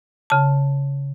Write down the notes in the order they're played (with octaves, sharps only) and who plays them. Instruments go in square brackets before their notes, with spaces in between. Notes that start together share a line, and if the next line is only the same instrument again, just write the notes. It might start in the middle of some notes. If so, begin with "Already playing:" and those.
[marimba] C#3 A5